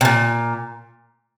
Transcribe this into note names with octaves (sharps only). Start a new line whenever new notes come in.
C3
A#2